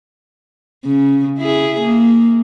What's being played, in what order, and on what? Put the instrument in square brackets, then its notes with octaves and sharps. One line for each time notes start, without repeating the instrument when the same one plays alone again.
[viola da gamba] C#3
E4 G#4
A#3